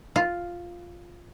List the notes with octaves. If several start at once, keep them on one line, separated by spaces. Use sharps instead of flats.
F4